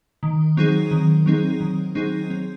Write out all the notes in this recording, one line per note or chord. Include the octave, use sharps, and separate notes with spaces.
D#3
F#3 C4 D#4 G#4
D#3
F#3 C4 D#4 G#4
D#3
F#3 C4 D#4 G#4
C4